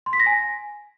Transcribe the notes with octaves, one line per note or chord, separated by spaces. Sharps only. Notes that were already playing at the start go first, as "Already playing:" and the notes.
C6
B6
A#6
G#5